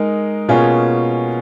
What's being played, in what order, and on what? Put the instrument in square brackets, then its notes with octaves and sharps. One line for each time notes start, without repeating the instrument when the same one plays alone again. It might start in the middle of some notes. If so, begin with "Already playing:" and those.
Already playing: [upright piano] G#3 D#4 A#4
B2 A#3 C#4 F4 G#4